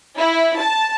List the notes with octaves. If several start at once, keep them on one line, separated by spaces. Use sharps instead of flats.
E4
A5